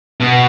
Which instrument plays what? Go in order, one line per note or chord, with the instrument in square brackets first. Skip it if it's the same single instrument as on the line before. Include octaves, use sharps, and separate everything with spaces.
[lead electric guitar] B2